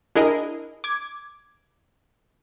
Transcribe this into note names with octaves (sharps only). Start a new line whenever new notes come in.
D4 E4 G#4 A#4 D#5
D6 G#6